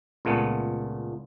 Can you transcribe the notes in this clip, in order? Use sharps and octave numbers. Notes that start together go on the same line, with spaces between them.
C#2 A#2 A3 B3